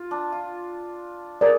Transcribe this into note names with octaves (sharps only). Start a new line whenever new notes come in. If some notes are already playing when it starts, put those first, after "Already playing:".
Already playing: F4
D4
F4
G#4 A#4 D5